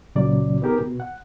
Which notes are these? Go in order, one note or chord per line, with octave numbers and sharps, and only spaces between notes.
C#2 A#2 C#3 F#3 C#4 D5
B3 C4 D#4 G4 G#4 A#4
B2
F#5